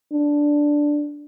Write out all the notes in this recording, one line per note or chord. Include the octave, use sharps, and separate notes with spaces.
D4